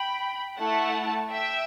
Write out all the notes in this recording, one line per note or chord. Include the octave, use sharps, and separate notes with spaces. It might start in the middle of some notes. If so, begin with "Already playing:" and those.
Already playing: G5 B5
A3 E4 A4 F#5 A5
E5 G5